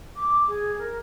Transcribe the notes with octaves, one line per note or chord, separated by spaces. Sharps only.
D6
G#4
A#4